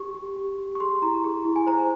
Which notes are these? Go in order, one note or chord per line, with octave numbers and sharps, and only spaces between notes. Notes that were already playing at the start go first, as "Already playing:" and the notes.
Already playing: G4 C#6
G4
G4
G4
C#6
G#4 C6
E4 A#5
G#4
E4
G#5
C5 A#5